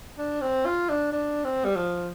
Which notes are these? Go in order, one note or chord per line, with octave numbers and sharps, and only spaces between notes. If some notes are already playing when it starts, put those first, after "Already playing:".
D4
C4
F4
D4
D4
C4
G3
F3